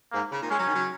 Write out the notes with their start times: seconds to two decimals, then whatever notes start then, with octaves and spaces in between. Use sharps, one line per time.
0.12 G#2 A#3
0.31 C#3
0.41 A#2 D#3
0.50 G#3 C#4
0.59 F#3
0.66 D#3
0.73 C#3 F#3